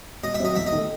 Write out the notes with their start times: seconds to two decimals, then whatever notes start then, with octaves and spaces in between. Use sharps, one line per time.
0.23 B2 D#5
0.35 E5
0.40 F#3 C4 D#5
0.56 E2 E5
0.66 D#5
0.72 D#3 A3